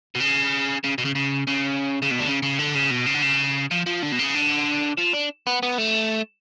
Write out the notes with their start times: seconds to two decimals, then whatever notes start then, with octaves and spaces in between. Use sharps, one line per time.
0.15 B2
0.20 C#3
0.84 C#3
0.98 B2
1.05 C#3
1.15 C#3
1.47 C#3
2.02 C#3
2.11 B2
2.20 D3
2.28 C#3
2.43 C#3
2.59 D3
2.75 C#3
2.91 B2
3.07 C#3
3.15 D3
3.23 C#3
3.71 F3
3.86 F3
4.02 D3
4.12 B2
4.19 C#3
4.35 D3
4.98 F3
5.14 D4
5.47 B3
5.63 B3
5.78 A3